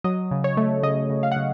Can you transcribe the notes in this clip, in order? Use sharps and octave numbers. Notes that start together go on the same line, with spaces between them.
F#3 D#5
C#3
C#5
A3
C#3 D#5
C#3
F5
F#5
C#3